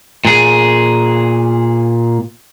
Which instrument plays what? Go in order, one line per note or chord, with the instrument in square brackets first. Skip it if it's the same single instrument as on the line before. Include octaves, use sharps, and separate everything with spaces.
[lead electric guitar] A#2 G#4